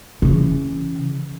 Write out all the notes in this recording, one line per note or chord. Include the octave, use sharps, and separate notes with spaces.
C#3 E3